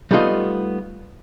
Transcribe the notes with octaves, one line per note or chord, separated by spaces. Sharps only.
G3 A3 B3 D#4 F4 D#5